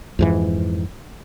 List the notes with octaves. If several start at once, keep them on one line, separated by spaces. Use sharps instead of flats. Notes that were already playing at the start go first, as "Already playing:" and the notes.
F2 G#2 E3